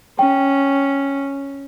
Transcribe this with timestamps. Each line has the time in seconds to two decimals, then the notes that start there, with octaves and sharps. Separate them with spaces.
0.19 C#4 G5